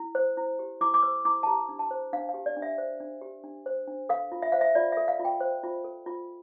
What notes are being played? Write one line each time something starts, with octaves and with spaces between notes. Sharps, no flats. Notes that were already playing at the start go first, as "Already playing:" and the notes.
Already playing: E4
C5
E4
G4
E4 D6
D6
C5 E6
E4 D6
A5
G4 A#5
D4
A5
C5
D4 F5
F5
G4
D5
D4
E5
C5
D4
G4
D4
C5
D4
A4 F5
F4
E5
C5 F5
E5
F4 D5
A4 E5
F5
F4
G5
C5
F4
A4
F4